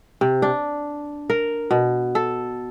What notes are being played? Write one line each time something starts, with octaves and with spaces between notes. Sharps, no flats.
C3
D4
A#4
B2
A4